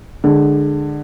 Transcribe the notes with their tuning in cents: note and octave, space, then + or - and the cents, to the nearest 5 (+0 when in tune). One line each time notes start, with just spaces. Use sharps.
D3 +15 G#3 +0